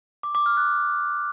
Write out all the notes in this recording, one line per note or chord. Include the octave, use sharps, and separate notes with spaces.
D6
D6
F6
F#6